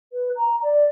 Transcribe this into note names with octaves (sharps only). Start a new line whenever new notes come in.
B4
A#5
D5